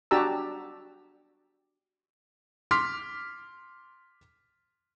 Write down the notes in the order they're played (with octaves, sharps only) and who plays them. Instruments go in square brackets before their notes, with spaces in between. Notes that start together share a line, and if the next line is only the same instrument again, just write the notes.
[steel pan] D4 F#4 G4 A5 A#5 E6
[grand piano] C6 D6 F6 B6